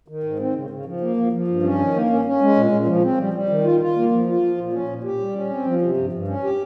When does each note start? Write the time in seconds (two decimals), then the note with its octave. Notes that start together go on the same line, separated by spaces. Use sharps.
0.08 D#3
0.23 G#2
0.39 C4
0.55 C#3
0.70 C#3
0.85 F3
1.01 A#3
1.17 F3
1.33 F3
1.48 G2
1.63 C#4
1.79 D#3
1.94 A#3
2.10 C#4
2.25 C#4
2.41 G#3
2.56 A#2
2.71 A#2
2.87 F3
3.03 C4
3.18 G3
3.33 G3
3.49 D#3
3.64 F4
3.80 F4
3.96 A#3
4.12 F3
4.27 F4
4.42 F3
4.58 A#2
4.73 C#4
4.88 A#2
5.04 G4
5.20 G3
5.35 C#4
5.50 C4
5.66 F3
5.82 C3
5.97 G2
6.13 G2
6.28 C#4
6.43 G4